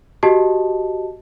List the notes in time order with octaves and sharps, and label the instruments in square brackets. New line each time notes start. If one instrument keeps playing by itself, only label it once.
[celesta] F#4 G4 D#5 A5